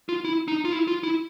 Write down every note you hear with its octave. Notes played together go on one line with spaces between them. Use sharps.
F4
E4
D#4
F4
E4
F4
E4